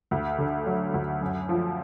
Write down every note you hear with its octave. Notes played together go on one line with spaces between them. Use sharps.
D2
D3
F#3
D2
F#2
F3